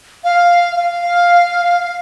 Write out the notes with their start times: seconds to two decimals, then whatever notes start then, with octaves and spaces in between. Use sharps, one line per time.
0.24 F5
0.76 F5